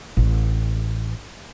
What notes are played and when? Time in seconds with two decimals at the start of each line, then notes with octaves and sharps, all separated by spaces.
0.17 A1